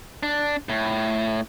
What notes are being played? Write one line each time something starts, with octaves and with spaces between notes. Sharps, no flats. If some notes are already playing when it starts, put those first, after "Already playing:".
D4
A2